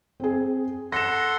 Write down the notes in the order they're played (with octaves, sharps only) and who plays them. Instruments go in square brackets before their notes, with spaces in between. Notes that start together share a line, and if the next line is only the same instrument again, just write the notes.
[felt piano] C4 G#4
[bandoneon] A4 F#5 C6 [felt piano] A#6 E7